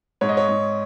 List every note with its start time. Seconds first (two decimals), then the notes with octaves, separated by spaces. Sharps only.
0.21 G#2 C#5
0.29 D#5
0.37 C#5
0.48 G#2